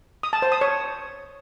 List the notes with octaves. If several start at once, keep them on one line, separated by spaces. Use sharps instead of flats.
D#6
A5
C5
D#6
C#5